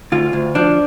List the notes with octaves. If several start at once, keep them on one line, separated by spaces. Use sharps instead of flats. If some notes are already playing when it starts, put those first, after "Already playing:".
D2 F4
D2
F3 D4